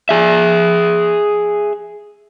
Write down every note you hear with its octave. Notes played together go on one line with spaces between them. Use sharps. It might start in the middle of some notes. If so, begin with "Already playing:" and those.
G#4 E5